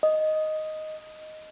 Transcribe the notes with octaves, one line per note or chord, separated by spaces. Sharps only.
D#5